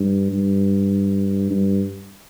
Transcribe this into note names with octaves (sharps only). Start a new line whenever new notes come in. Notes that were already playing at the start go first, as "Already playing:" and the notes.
Already playing: G2
G2
G2